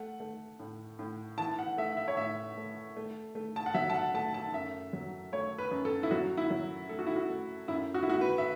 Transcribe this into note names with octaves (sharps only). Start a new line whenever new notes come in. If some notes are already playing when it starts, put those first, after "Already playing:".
Already playing: A3 F#5
A3
A2
A2
E3 A5
F#5
A3 E5
E5
C#5
A2 E5
A3
A3
A3
A5
F#5
F#3 E5
A5
F#5
A3 A5
A5
F#2 E5
F#3
A3 C#5
B4
F#2
A4
E4
F#3 F#4
E4
F#3
A3 A4
F#4
E4
F#4
A3
F#2 E4
F#4
E4
A3 F#4
B4
E5